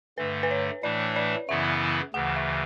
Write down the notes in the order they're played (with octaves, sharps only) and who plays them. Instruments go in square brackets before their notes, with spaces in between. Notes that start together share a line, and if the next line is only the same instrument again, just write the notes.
[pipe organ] G2 D3 A3 [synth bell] B4
[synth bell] B4
C#5
[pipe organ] A2 E3 A3 D4 [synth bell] D5
[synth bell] D5
[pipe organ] F#2 C#3 E3 B3 E4 [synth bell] E5
[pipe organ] D2 C#3 E3 [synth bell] F#5
[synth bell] E5